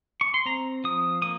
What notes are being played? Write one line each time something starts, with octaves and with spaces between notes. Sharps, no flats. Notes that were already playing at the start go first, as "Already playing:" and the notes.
C#6
C6
C4 A#5
F3 D#6
A#3 D#6